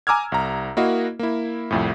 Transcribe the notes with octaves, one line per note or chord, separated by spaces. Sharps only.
G#5 A#5 D6 E6 F6 G#6
C2 A#5
A#3 E4 F#4 A#4 D#5 F5
A#3 E4
C2 F2 A2